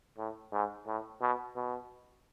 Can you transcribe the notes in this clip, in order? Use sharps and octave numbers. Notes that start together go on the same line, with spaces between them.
A2
G#2
A2
B2
B2